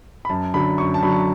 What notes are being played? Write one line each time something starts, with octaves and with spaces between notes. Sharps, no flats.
B5
F#2 A5
D3 F#3 B5
F#2 C#6
A5
D3 F#3 B5